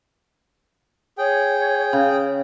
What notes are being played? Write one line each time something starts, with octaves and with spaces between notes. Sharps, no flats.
G#4 C#5 G5
C#3